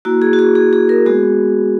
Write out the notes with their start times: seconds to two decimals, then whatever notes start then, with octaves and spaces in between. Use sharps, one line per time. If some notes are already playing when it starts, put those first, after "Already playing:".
0.05 A#3 E4 F#4
0.22 G#4
0.33 F#4
0.39 G#4
0.55 G#4
0.73 G#4
0.89 A#4
1.06 G#3 B3 F#4 G#4